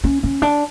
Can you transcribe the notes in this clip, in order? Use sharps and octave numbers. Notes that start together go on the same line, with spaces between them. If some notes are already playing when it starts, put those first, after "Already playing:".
C#4
C#4
D4